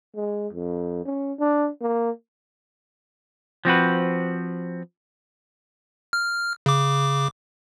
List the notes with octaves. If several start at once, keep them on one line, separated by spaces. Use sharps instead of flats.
G#3
F2
C#4
D4
A#3
F3 C4 F#4 B4
F6
C#3 D6